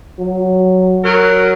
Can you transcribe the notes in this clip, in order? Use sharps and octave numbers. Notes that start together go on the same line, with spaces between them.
F#3
F#3 A#4